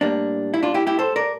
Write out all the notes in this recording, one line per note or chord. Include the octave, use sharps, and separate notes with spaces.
A2 G3 A#3 D4
E4
D4 F4
E4 G4
E4 G4
A4 C5
A#4 D5